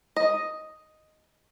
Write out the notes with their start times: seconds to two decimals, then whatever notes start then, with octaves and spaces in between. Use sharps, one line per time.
0.16 D#5